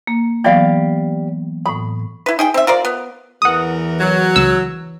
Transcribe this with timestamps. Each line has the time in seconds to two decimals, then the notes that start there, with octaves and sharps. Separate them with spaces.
0.07 A#3
0.44 E3 F#3 B3 G4 D5 F5
1.66 A2 B5 D#6
2.26 E4 B4
2.39 D#4 G#4 G5
2.54 C4 E5
2.67 F4 A#4 C5 D5
2.85 B3
3.42 E2 E3 A#4 F#5 D#6
4.00 F#3
4.36 C#2 E6